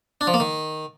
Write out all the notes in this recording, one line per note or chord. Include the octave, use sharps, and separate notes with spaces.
D4
F3
A#3
D#3